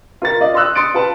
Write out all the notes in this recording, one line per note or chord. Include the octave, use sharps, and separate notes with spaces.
F4 A#4 A6
D5 D#5 F5
C6 D#6 E6 F#6
C6 D#6 A6 C#7 D7
F4 B4 A5